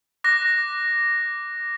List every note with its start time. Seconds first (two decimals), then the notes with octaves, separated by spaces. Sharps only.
0.24 D6 F#6 A#6